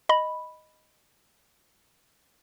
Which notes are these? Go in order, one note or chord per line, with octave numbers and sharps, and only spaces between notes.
D#5 B5